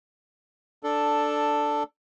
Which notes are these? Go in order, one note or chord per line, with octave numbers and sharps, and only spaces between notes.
D4 A4